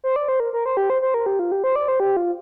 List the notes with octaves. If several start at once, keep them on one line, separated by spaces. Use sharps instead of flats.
C5
D5
C5
A#4
A#4
C5
G4
C5
C5
A#4
G4
F4
G4
C5
D5
C5
G4
F4